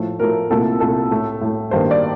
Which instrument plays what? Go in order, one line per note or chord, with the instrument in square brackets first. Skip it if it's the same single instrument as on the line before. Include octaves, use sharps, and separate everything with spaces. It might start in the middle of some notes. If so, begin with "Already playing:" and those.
Already playing: [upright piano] A2 F3 A3
A2 F3 A3 A#4
C2 A#2 A3 A4
C2 A#2 A3 A4
A2 A3
A2 A3
G2 D#3 A#3 C5
D5